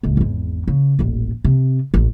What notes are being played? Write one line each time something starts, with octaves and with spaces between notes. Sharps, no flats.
D1 C#2
G#1 E2
C#3
D#1 A1
C3
A1